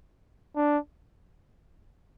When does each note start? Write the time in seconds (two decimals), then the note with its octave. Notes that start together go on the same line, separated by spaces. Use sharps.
0.56 D4